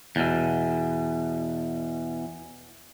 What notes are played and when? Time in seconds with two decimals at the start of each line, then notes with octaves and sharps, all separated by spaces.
0.16 E2 B2